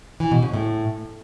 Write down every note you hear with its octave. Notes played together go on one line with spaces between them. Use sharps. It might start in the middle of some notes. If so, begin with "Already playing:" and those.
E3
B2
C#3
A2